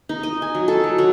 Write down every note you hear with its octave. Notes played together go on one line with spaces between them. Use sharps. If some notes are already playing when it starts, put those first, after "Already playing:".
D#4
D#5
G#5
F#3
A4
F#3
F#3